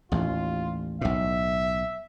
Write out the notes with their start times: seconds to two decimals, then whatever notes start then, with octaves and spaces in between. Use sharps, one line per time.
0.12 A1 D#2 F4
1.01 B1 A2 E5